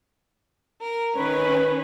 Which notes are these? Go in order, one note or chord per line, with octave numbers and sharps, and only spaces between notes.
A#4
D#3 C#4 B4